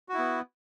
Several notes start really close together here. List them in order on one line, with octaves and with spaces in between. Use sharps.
F#4 E4 B3